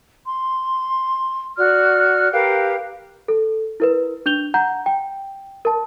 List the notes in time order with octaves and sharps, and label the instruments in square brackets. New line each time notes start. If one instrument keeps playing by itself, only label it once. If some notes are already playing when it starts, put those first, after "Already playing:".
[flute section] C6
F#4 D5 F6
G4 A#4 B4 F5
[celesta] A4
E4 A#4 B4
D4 G6 F7 G7
F#5 A#5 G6
G5
A#4 A5